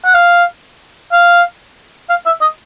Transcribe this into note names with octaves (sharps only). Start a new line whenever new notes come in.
F#5
F5
F5
F5
E5
D#5